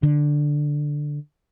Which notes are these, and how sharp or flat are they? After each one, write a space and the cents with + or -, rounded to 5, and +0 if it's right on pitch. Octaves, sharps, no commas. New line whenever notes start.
D3 +5